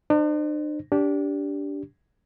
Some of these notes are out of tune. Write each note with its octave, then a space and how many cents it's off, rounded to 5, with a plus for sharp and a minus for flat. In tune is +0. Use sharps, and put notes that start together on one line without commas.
D4 +45 C5 +0
D4 -20 G4 +0